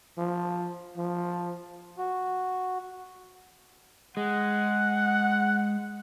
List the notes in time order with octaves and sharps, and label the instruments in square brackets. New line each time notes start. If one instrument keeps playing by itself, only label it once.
[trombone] F3
F3
[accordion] F#4
[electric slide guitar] G#3 [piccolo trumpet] F#5